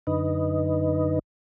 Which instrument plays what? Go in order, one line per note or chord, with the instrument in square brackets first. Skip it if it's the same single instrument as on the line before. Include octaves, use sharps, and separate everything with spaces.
[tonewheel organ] F#2 D3 D#4 B4 D#5